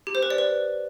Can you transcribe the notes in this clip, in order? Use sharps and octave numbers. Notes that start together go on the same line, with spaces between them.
G4
C5
B4
D5
B4